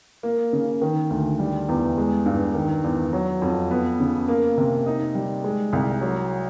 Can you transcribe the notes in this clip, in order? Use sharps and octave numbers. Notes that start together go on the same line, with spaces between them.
A#3
C#3
D#3
D2
G3
E2
G#3
G2
D#3
E2
F#3
F2
B3
C#3
A#3
C3
D#4
G3
G#3
C2
F#3